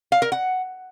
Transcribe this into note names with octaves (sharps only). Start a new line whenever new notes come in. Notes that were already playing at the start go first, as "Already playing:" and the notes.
F5
A#4
F#5